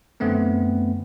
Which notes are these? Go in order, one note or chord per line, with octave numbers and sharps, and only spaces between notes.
F#2 D3 A3 B3 C4